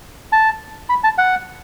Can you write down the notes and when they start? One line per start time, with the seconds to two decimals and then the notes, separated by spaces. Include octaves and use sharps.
0.32 A5
0.89 B5
1.04 A5
1.18 F#5